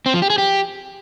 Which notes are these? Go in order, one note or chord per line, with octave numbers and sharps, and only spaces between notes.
C4
F3
G4
G#4
G4